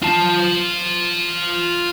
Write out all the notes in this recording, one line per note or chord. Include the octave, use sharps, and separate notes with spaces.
F4 A5